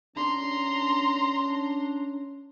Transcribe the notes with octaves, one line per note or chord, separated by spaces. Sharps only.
C#4 D4 A#5 C6